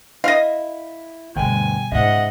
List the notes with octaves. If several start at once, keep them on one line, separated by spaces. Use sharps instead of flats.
E4 D#5 F5
D2 G2 B2 G3 G5 G#5
G#2 C#3 D#5 E5 F#5